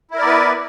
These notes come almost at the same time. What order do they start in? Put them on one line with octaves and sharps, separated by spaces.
E4 A#4 D5 B3 B4